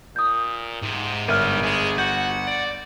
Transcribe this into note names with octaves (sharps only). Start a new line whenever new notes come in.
A#2 D#6 G6
G#2 C3
G1 G3 A#4 E5 F6 D#7
G#3 G#4
F#4 F#5 G6
D5